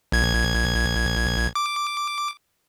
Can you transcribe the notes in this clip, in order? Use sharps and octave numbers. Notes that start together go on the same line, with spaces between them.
A#1 G#6
D6